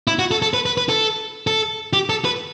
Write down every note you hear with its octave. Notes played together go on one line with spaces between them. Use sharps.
E4
F#4
A4
A4
B4
B4
B4
A4
A4
G4
A4
B4